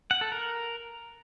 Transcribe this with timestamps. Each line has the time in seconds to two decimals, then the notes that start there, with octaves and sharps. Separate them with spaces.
0.11 F#5
0.21 A4
0.32 A#4